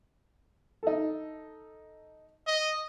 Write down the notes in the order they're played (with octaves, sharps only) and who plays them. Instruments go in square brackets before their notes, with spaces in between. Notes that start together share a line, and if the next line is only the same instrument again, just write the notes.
[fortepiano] D#4 A4
[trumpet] D#5